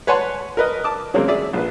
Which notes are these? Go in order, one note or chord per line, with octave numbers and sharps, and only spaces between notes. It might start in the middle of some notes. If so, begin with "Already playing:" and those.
B4 C#5 F#5 G#5 A5 C6
A#4 B4 D#5
A5 D6
C#3 F#3 G#3 A#3 C4
G#4 D5 E5
A#1 B4